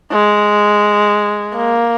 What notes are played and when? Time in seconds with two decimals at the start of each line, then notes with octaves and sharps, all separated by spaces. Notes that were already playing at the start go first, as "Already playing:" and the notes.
0.12 G#3
1.55 A#3